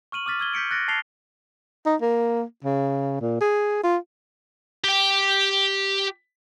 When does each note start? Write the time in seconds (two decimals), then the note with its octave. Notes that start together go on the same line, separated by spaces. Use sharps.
0.12 C#6 F6 D#7 F#7
0.26 D6 E6 F6 A6 B6
0.40 E6 G#6 G7
0.53 G6 B6 C#7 D7
0.71 F#6 A6 A#6 C#7 D7
0.88 A5 A6 C7 F7 G7
1.86 D#4
2.02 A#3
2.65 C#3
3.21 A#2
3.41 G#4
3.84 F4
4.84 G4 G5